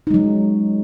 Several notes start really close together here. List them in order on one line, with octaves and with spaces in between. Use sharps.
D#4 G#3 F#3